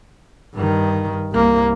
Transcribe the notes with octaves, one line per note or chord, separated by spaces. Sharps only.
G2 D#3
C2 A#3